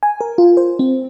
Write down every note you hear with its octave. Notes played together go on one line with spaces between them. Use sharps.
G#5
A#4
F4
C5
C4